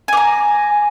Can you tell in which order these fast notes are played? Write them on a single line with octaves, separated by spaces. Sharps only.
G#5 D6 A#5